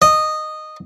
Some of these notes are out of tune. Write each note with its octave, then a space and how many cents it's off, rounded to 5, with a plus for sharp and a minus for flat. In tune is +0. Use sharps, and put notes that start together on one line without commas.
D#5 -10